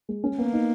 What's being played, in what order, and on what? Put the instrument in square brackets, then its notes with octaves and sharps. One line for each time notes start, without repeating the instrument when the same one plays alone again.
[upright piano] G#3
C#4
[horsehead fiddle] A#3 [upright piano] B3
[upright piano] D#4